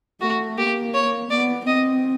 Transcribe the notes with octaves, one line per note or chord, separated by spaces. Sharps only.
A3 F#4
A#3 G4
C#5
B3 D5
C4 D#5